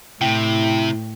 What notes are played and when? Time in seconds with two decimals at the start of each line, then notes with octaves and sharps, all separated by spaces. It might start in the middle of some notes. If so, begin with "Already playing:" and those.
0.21 A2 C3 E4 G5